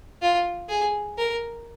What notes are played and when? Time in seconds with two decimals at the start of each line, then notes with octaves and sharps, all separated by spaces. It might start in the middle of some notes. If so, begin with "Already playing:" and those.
0.22 F4
0.69 G#4
1.18 A#4